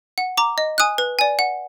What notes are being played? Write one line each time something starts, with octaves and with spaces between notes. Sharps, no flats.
F#5
A#5 D6
D#5
G#5 D#6 F#6
B4
D5 G#5
F#5